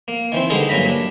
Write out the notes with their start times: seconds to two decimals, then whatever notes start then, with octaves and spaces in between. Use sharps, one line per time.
0.08 A#3
0.32 D#3 E3 C4
0.50 D3 G3 G#3 D#4 G#4 A4
0.69 G2 A#2 F#3 A#5 B5
0.89 D4